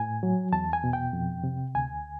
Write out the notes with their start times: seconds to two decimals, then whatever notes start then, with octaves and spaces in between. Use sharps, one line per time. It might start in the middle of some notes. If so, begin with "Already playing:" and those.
Already playing: A2 G#5
0.23 F#3
0.52 E2 A5
0.73 G#5
0.84 B2
0.93 G5
1.13 F2
1.44 C3
1.75 D2 G#5